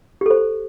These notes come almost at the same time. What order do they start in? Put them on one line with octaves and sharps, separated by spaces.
G4 A4 C5